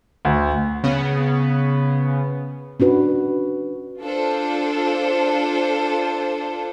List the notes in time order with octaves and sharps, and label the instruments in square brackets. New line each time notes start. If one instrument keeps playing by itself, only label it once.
[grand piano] D2
[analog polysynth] C#3 B3
[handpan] C#4 D4 F#4 B4
[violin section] D4 F4 A4 C5